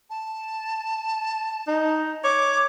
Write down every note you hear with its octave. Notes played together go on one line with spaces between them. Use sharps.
A5
D#4
C#5 D6